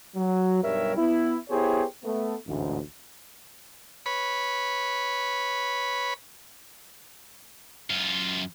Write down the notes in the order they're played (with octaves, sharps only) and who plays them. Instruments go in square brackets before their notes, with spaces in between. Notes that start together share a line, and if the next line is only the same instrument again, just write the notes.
[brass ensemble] F#3
B1 G2 G3 A#4 C#5 E5
B3 E4
B3 E4 G4 G#4 C5 C#5
A3 B3
A1 D2 G#2
[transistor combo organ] B4 C#5 B5
[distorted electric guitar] F#2 F4